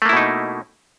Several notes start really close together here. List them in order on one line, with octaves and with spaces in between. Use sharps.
A3 A#3 E4 B2 D#4